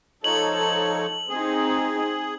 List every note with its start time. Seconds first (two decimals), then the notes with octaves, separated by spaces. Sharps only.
0.24 F3 D#4 A4 C#5 F#7
1.29 C4 D#4 G#4